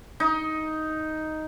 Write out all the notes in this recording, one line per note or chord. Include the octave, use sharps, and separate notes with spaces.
D#4